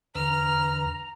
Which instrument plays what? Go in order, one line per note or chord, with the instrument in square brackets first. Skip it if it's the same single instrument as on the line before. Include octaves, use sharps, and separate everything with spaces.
[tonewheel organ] E2 D3 B4 [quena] A#5 [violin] F6